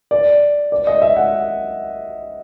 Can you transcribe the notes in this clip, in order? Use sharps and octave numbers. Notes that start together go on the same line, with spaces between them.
D5
D5
D#5
E5
F#5